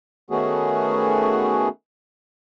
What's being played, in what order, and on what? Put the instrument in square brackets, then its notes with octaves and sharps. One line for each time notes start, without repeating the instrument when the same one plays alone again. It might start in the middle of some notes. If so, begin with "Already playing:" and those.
[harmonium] D#3 A3 B3 C#4 F#4 G#4